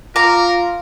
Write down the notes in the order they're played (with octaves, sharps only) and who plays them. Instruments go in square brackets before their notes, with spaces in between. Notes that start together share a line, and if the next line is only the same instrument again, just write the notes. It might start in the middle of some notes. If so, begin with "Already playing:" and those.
[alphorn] F4 [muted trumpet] A#4 [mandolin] A#5 [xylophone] D6